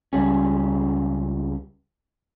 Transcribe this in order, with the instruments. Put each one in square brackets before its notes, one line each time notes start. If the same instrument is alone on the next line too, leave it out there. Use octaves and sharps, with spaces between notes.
[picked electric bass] C#2 G3 C#4